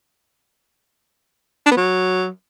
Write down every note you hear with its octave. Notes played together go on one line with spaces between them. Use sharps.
D4
B3
F#3